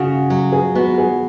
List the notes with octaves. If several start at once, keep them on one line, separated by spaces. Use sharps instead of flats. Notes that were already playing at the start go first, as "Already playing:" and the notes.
Already playing: C#3 F#4
F#3
G#4
B3 F#4
G#4